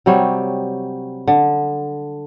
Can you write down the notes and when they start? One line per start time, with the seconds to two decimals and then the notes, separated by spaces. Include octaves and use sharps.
0.06 C3 F#3 G3 C#5
1.28 D3